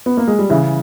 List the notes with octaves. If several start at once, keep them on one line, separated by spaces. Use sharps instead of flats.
B3
A#3
G#3
G3
C#3 E3